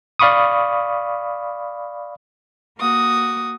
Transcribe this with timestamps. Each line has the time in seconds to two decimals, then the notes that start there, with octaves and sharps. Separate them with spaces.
0.19 D5 F5 B5 C#6 D#6
2.80 A#3 F#4 D#6